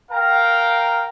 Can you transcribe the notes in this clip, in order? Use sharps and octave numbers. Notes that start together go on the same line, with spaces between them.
A#4 F5 G5 A#5